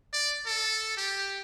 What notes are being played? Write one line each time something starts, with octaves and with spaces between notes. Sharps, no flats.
D5
A4
G4